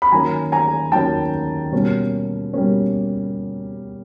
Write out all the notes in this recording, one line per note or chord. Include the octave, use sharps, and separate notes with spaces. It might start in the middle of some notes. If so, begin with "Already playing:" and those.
B5
D#3 F#3 A#3 C#4 G#5 A#5
G#5 A#5
D#3 F#3 A#3 C#4 G5 A5
B2 G3 A#3 C#4
B2 G3 A#3 C#4